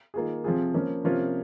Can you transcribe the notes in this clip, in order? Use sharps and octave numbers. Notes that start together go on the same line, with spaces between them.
D#3 A#3 F4 G#4
C3 F3 C4 F4 G#4
F3 A#3 C#4
C3 F3 A#3 C#4 F4